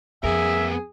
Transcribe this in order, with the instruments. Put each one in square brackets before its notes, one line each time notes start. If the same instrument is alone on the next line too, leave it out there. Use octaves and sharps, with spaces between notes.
[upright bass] F2 [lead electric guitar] B3 A#4 [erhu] G#4 [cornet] E5